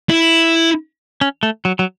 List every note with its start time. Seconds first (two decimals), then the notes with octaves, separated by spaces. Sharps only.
0.10 E4
1.21 C#4
1.43 A3
1.65 F#3
1.79 F#3